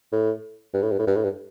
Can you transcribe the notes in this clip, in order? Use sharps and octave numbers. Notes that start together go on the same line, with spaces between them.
A2
G2
A2
G2
A2
G2
A2
G2